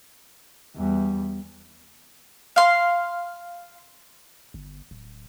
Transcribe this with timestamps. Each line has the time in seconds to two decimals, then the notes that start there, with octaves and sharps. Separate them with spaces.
0.76 E2 G3
2.56 F5 C6
4.54 G1
4.91 D1